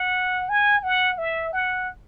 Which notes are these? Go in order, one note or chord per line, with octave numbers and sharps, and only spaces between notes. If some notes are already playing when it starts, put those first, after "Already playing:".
Already playing: F#5
G#5
F#5
E5
F#5